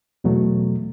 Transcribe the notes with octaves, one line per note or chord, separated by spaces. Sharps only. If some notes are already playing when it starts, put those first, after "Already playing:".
E2 B2 F#3 A3